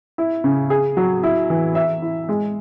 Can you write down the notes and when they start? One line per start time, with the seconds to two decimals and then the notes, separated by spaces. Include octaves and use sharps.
0.18 E4
0.44 C#3
0.70 G#4
0.97 F#3
1.23 E4
1.50 E3
1.75 E5
2.02 E4
2.29 G#3